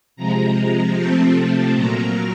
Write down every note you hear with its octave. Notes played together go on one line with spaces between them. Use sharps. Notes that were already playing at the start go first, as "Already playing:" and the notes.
C3 F3 G#3 A#5
C3 F3 A3 C4 A5
A#2 F#3 A#3 A#5